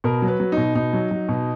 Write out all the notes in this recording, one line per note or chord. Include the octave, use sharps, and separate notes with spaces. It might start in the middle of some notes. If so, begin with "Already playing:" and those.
B2 A#4
F#3
B4
F#3
B2 D#4
B2 D#4
F#3
F#3
B2